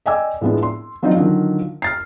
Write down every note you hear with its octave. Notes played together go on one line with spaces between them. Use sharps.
D5 D#5 G5 G#5 D6 E6
A2 F3 G#3 B3 D4
C6
F3 F#3 C4 D4 D#4 F4
D3 D#3 F3 F#3
F6 A6 C7